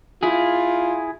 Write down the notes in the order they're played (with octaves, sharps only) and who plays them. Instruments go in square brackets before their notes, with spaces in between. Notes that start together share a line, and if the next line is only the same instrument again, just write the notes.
[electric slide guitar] E4 G#4 [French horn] F4